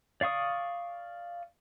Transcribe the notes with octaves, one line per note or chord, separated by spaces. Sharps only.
D5 F5 C#6 D#6